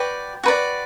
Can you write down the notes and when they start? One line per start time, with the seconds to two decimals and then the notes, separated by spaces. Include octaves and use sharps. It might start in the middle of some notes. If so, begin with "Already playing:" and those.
Already playing: F#4 B4 D5 G5
0.43 F#4 B4 D5